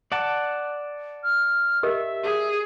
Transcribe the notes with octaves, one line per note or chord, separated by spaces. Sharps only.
D5 F#5 A5
F6
G4 A#4 D#5 E5
G#4